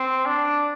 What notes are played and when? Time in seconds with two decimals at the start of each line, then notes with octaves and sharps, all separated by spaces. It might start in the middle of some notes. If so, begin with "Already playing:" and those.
Already playing: C4
0.25 D4